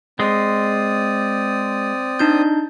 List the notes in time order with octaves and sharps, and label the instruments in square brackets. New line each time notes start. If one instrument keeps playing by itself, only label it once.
[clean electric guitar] G#3 [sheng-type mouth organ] C4 D5 D#6
[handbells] D4 D#4 G6